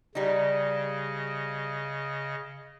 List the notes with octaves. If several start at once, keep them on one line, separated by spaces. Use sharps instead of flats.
C#3 G3 D#4 D#5